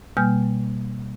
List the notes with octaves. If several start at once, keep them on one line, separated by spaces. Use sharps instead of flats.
B2 G3 A#3 G#5 F6 G6